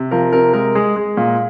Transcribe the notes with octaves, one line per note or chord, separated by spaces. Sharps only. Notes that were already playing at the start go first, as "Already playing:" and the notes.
Already playing: C3
F3 A#4
C3 A#4
G#3 A#4
G#3 G#4
G#3
A#2